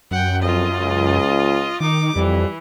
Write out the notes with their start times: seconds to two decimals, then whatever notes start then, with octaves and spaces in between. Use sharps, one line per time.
0.11 F#2 F#5 G5
0.42 F2 F4 D#5
0.78 C#2
1.80 D#3 D#4 D6
2.16 F2 E3 G3